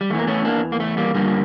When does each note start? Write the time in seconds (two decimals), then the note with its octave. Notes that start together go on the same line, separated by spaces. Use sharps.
0.01 G3
0.10 E2 A3
0.15 E3 A#3
0.27 A3 C#4
0.45 A#3 D4
0.72 A#3
0.80 A3
0.97 G3 A#3
1.14 G2 D3 F3 G3 A#3